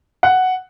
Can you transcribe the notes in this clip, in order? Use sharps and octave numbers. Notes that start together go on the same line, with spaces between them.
F#5